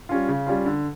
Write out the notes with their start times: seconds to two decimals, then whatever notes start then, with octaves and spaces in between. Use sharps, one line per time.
0.09 G3 C#4 F4
0.28 C#3
0.47 G3 C#4 F4
0.66 D3